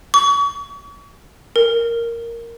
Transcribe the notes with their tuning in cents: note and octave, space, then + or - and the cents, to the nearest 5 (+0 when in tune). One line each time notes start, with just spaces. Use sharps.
C#6 +40
A#4 -5